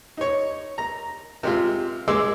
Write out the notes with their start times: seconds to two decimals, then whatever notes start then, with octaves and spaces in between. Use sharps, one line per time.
0.17 D#4 C#5
0.78 A#5
1.43 C3 G#3 F4
2.08 G#3 G#4 C6 D6 E6